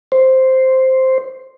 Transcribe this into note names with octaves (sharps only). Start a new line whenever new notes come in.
C5